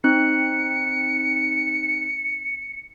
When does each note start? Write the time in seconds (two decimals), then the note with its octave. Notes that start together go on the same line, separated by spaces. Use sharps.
0.04 C4 D#4 F#6 C#7